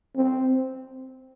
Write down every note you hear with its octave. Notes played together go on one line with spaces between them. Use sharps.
C4